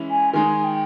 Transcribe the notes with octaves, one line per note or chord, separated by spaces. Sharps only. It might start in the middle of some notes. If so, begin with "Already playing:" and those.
Already playing: E3 G#3 C#4 E4
G#5
D#3 G#3 D#4 G#5
G5